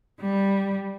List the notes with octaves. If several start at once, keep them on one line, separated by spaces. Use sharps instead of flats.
G3